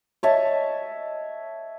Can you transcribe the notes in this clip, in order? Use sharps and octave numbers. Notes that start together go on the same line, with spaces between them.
C#5 D#5 E5 A5